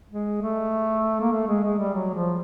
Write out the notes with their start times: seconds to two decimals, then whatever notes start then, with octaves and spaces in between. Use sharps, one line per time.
0.11 G#3
0.42 A3
1.21 A#3
1.33 A3
1.48 G#3
1.64 G#3
1.79 G3
1.94 F#3
2.14 F3